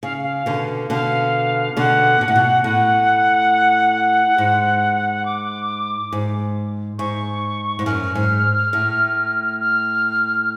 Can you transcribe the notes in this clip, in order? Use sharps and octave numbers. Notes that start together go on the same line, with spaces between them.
C#3 F5
F5
B2 D3
B2 D3 F5
B2 D3 F#5
B2
A2
B2
A2 F#5
G#2
D6
G#2
G#2 C#6
G#2
F#2 F6
G#2
A2
F6